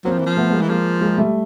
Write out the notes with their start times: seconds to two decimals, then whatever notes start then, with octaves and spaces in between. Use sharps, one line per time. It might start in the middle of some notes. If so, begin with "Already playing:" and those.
0.04 F#3 A#3 C4
0.12 F3
0.19 E3
0.26 F3
0.37 A3 B3
0.49 B3
0.53 G#3 A#3
0.62 E3
0.69 F3 G#3 A#3
1.01 G#3 A#3
1.17 G3 A3